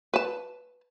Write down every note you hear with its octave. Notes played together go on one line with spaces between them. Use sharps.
B4 A5